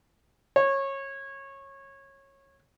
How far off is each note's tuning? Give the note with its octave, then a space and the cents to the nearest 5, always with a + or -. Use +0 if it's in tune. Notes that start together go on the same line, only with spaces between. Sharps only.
C#5 -20